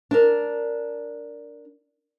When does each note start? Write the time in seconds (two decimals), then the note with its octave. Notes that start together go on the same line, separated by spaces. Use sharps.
0.11 D4 A#4